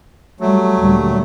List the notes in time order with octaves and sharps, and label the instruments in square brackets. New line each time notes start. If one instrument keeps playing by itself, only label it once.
[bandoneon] F#3 A3 [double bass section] G3
[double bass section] D2 A#2 G3